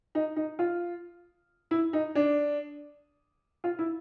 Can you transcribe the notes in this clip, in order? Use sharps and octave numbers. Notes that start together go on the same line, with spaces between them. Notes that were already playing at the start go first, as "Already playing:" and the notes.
D#4
D#4
F4
E4
D#4
D4
F4
E4